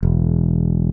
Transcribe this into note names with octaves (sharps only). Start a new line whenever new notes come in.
E1